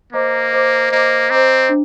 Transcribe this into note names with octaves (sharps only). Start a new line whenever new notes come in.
A#3 C5 D#5 A#5 D6
C5 D#5 A#5 D6
A#3 C5 D#5 A#5 D6
C4 C5 D#5 A#5 D6
D4